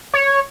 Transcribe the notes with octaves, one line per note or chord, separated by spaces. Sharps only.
C#5